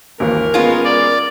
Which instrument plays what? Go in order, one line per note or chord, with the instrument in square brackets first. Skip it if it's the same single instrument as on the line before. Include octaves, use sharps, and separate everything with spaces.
[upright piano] G#1 D#2 E3 [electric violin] A#4
[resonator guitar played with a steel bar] G#3 F4 [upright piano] B3 C#4
[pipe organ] D5